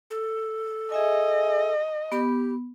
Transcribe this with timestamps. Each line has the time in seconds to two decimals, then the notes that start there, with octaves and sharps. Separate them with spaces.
0.11 A4
0.92 G#4 D#5 E5 G#5
2.12 B3 G4 B5